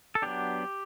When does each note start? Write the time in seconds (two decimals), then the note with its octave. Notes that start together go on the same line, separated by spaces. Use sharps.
0.15 A4
0.22 F#3 B3 D4 G4